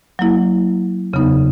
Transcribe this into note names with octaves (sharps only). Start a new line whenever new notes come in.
F#3 A#3 E4
E2 C#3 F#3 B3 D#4